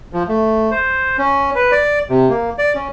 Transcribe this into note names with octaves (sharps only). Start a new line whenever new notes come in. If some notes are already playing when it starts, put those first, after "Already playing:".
F3
A3
C5
C#4
B4
D5
C3
A#3
D5
C#4